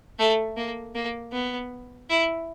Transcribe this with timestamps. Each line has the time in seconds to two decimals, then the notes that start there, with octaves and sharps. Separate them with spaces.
0.19 A3
0.57 A#3
0.95 A#3
1.32 B3
2.10 E4